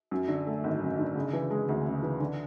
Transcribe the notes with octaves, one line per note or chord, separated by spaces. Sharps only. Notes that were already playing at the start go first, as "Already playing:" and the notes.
F#2
D3
A3
G#1
F#2
D3
C#3
E3
G#3
D2
C#3
E3
D3